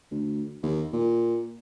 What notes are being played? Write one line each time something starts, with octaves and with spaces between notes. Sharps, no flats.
D2
D#2
A#2